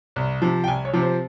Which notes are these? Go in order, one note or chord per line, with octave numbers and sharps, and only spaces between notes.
C2
C3 F3
G5
C2 G#5
C#5
C3 F3
C5